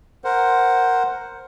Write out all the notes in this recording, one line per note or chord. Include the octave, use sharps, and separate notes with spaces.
A#4 C5 F#5